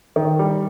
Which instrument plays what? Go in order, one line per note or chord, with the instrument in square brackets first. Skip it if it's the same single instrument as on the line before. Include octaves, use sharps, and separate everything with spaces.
[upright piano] D#3
G3